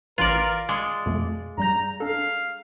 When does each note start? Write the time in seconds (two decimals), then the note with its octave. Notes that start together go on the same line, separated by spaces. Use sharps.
0.18 A1 E3 F4 A#4 B4 D5
0.69 G#3 D5 D6 D#6 C#7
1.06 F2 B2 A3
1.58 G2 G3 A#5 G6
2.00 D4 A4 F5